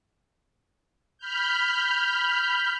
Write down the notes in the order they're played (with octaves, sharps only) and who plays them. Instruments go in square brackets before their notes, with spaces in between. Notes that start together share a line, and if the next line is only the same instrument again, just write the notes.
[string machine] B5 F6 G6